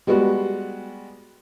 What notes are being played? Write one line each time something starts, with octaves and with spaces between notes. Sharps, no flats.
G3 G#3 B3 F#4